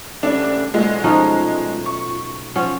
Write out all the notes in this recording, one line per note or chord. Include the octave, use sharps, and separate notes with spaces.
C#3 G3 A3 D4
B1 G#3 A3 F4 F#4
F3 C#4 D#4
C#6
F3 C#4 F#5